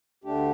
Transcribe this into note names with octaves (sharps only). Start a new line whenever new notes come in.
D2 D3 A3 D4 G4